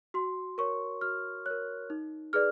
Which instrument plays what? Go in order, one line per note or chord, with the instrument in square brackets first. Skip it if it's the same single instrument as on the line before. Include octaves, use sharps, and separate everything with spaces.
[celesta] F#4 C6
A#4 C#5 C#6
F#4 F6
A#4 C#5 F#6
D#4
G#4 B4 D5 F6